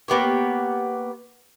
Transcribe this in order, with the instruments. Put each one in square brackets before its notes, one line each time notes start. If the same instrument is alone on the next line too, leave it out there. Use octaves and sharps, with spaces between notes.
[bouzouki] A#3 B3 G4 C#5